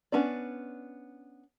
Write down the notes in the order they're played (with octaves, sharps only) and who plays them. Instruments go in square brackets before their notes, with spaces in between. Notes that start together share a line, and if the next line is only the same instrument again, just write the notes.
[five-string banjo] B3 C#4 D4 D5